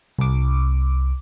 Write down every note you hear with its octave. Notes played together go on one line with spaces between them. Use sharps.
C2 D6